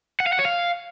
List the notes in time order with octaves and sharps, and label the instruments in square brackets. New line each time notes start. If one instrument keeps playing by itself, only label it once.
[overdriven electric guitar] F#5
F5
F#5
C#5
F5